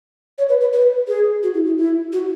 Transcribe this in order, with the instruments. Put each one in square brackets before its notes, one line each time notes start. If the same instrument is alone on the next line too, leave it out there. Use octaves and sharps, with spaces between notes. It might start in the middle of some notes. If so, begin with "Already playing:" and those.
[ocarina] C#5
B4
B4
B4
G#4
F#4
E4
E4
E4
F#4